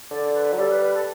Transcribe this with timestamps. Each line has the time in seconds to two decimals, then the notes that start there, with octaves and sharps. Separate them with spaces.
0.11 D3 D5
0.34 B4
0.53 F#3
0.58 G3 A4
0.70 B4
0.81 B4
0.94 A4